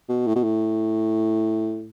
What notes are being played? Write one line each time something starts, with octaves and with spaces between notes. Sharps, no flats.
B2
A2
B2
A2